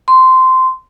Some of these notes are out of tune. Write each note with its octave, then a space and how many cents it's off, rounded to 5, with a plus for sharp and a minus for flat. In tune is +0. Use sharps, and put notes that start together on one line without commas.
C6 -15